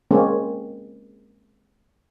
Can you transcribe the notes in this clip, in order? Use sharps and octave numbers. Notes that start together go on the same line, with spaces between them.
G#3 A#3 C4 C#4